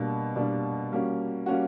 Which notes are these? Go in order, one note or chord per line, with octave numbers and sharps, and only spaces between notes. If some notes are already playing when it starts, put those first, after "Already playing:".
Already playing: B2 G3 A#3 D4
B2 G3 A#3 D4
G3 A#3 C#4 F#4
G3 A#3 C#4 F#4